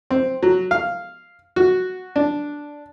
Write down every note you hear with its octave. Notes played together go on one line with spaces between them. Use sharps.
C4
F#3
F5
F#4
D4